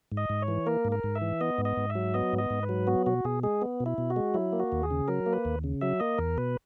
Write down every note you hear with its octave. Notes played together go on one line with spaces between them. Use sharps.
G#2
D#5
G#2
C#5
E3
A#3 A#4
G#2
A#4
G#2
E5
E3
B3 D#5
G#2
D#5
G#2
E5
F#3
B3 D#5
G#2
D#5
G#2
B4
F#3
B3 F#4
B2 F#4
B2 G#4
G#3 G#4
B3
B2
E4
B2
F#4
G#3
F#3 E4
A#3
F#4
D#2
G#4
C#3
F#3 A#4
A#3
B4
D#2
C#3
F#3 E5
A#3 D#5
E2 A#4
B2 B4